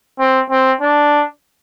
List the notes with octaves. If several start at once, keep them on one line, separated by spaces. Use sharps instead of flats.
C4
C4
D4